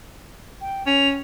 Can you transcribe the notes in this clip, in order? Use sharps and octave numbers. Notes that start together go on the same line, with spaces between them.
G5
C#4 F7